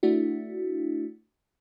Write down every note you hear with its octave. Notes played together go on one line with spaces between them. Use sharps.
A3 D4 E4 F#4